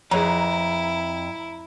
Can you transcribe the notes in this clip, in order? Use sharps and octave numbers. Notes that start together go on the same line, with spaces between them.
F2 E4 G#4 B4 C#5 A#5